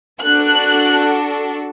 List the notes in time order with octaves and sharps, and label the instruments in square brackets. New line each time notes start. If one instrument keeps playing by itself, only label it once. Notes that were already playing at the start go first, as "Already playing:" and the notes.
[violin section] D4 F#4 A4 F#6